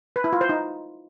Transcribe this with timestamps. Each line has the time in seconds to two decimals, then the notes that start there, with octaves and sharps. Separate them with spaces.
0.16 B4
0.24 E4
0.33 F4
0.41 C5
0.49 D#4